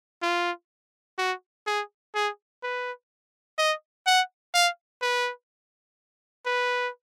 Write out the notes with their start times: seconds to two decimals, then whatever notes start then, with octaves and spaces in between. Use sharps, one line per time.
0.23 F4
1.18 F#4
1.67 G#4
2.15 G#4
2.63 B4
3.59 D#5
4.07 F#5
4.54 F5
5.02 B4
6.46 B4